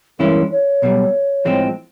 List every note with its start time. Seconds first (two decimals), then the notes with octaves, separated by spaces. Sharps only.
0.19 G2 E3 G#3 C#4 E4 A#4
0.51 C#5
0.82 B1 B2 G3
1.45 A2 F3 G#3 C4